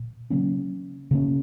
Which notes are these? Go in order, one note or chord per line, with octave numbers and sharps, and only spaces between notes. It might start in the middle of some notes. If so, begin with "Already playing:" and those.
Already playing: A#2
C#3 F#3 A#3 C#4
C#3 A#3 C#4